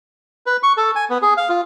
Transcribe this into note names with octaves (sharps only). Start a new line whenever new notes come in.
B4
C#6
A4
G#5
B3
G#4
F5
F4